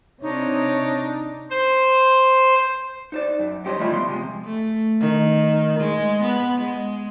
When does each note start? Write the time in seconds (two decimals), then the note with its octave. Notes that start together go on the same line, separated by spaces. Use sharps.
0.22 C3 D4 D#4 C#5
1.50 C5
3.12 D#4 C5 D5
3.39 F#2
3.64 G2 C#4 G4 C5 C#5 D#5
3.78 F3 G3 A3 D4 E4 F4
3.92 F3 B3 C6
4.08 C3 G#3
4.45 A3
5.00 D#3
5.79 G#3
6.22 B3
6.58 G#3